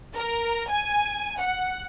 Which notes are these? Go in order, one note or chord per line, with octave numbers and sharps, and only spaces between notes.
A#4
G#5
F#5